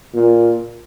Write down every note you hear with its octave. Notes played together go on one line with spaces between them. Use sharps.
A#2